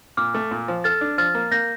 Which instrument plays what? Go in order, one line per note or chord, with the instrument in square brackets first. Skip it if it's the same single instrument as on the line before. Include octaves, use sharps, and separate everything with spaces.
[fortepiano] A#2 [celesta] D6 F6
[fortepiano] A3
A#2
F3
[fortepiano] A4 [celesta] F6 A6
[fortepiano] D4
[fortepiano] F3 [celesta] F6 A6
[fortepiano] A#3
[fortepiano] A#3 [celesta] G6 A#6